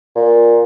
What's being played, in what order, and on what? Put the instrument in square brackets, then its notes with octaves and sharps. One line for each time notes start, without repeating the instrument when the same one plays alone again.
[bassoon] A#2